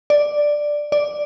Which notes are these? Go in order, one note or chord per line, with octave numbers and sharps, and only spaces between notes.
D5
D5